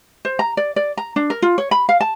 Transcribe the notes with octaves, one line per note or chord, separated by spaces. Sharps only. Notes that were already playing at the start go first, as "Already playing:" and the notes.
C5
A#5
D5
D5
A#5
D4
A#4
F4
C#5
B5
F5
A5